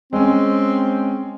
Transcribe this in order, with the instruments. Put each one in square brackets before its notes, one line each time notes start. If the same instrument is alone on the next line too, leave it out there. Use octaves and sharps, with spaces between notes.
[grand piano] G#3 C#4 [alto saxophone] C4